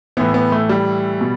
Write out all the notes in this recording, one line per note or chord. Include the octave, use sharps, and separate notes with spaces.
A2 E3 B3
B3
A3
G3
B2